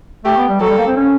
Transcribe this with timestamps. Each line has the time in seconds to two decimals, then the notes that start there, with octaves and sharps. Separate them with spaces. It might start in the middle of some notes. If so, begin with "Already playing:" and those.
0.25 A3 G4
0.37 B3
0.49 G3
0.61 F#3 A4
0.69 G3
0.78 A#3
0.87 C4
0.97 C#4